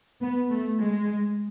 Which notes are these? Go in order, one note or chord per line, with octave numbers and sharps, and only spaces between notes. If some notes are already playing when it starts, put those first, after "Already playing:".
B3
A3
G#3